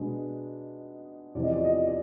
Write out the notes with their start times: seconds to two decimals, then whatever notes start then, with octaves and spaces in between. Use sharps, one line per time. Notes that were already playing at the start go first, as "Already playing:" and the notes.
Already playing: B2 G#3 B3 D4
1.35 E2 C3 F3 D5
1.43 D#5
1.52 D5
1.64 D#5
1.87 D5